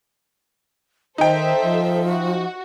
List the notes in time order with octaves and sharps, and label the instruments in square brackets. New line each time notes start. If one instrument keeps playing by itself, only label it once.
[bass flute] D#3 [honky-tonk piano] D#4 G5 [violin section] A4 C5 E5
[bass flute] F3
[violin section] F#4